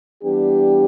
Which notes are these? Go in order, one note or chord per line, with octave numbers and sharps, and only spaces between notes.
E3 G3 B3 D4 G4